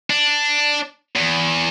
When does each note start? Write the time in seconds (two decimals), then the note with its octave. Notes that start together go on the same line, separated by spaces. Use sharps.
0.10 D4
1.15 E2